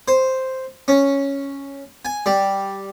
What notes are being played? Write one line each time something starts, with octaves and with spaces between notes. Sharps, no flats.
C5
C#4
G#5
G3